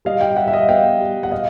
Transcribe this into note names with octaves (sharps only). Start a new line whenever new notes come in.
G3 D#5 F5
F5 G5
G3 E5 F#5
E5
D#5 F5
B3 F5 G5
G3
F#5
D#5 F5